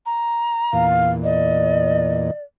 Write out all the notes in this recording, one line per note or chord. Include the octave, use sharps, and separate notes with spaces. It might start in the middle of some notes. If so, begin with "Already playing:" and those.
A#5
E2 A#2 F5
D5 D#5